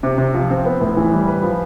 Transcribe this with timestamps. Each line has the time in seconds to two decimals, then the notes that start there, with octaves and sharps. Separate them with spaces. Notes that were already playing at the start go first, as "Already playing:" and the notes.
0.03 C3
0.18 C3
0.34 F3
0.50 C4
0.65 B3
0.81 A2
0.97 E3
1.12 G3
1.28 B4
1.43 F3